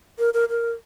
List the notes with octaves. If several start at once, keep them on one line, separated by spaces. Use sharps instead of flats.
A#4
A#4
A#4